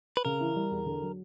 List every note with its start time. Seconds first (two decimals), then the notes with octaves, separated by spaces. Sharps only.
0.17 B4
0.25 C#3 A#4
0.40 E3
0.56 G3
0.71 E2
0.86 D3
1.02 F#3